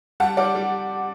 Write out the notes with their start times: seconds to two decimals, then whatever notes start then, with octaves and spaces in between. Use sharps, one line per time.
0.20 G3 F#5 A5
0.37 G3 D5 F#5
0.55 G3